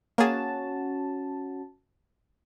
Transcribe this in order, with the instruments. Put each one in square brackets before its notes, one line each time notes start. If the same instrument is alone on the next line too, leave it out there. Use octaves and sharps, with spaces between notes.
[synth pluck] A#3 G#4 [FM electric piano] C#4 F#4 A5